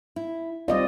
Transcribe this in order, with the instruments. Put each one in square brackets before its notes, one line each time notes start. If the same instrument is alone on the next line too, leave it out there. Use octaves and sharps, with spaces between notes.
[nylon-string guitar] E4
[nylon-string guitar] G3 C4 F4 [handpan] D5 D#5